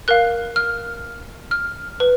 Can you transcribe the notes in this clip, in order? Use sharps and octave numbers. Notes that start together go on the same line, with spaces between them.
A#4 F5 F#6
F6
F6
B4